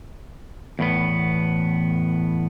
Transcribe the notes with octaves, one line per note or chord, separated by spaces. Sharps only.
E2 A2 B3